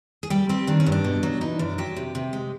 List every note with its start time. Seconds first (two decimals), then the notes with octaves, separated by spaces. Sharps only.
0.23 G#4
0.30 G3 G4
0.49 C4 G4
0.67 D#3 D4
0.80 C#4
0.86 G2
0.92 D4
1.04 B2
1.23 F#3
1.41 E3 D#4
1.59 F#2 D4
1.78 F#3 G4
1.96 C3
2.15 C3
2.33 G#3